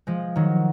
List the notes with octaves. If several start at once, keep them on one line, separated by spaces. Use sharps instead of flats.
F3 G#3
D#3 F#3